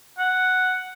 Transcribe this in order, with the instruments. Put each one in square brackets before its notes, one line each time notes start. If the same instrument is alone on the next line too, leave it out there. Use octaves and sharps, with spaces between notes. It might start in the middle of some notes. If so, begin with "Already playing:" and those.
[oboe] F#5